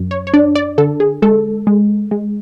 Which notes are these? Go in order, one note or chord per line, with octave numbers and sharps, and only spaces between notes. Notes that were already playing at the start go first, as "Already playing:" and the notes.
Already playing: F#2
C#5
C#5
D4 D5
D5
D3 A4
G#4
G#3 A4
G#3
G#3